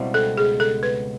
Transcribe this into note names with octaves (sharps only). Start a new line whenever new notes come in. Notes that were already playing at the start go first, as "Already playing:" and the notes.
Already playing: C#2 B2 G3 C4 E4
A4
G#4
A4
B4